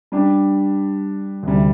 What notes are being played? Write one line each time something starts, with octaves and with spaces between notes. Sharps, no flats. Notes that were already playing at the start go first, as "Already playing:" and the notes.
G3 D4 G4
D2 C3 G3